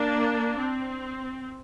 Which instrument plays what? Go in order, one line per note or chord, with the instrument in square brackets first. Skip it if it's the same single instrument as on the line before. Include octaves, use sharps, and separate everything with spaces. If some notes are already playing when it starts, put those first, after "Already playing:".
Already playing: [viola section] A#3 D4
C4